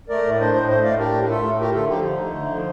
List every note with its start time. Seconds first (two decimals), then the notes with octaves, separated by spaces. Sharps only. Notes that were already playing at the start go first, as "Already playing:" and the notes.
0.09 A3 A#4 D5
0.25 A2
0.39 D4 C5 D#5
0.54 A2 C5 D#5
0.69 A3 C5 D#5
0.84 A2 D5 F5
0.99 D4 G4 A#4
1.14 A2
1.29 A3 F4 A4
1.45 A2
1.59 A3 G4 A#4
1.74 D3 F4 A4
1.89 F3 D#4 G4
2.04 D3 D#4
2.19 A3
2.35 D3
2.50 F3